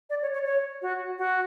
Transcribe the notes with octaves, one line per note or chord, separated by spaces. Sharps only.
D5
C#5
C#5
C#5
F#4
F#4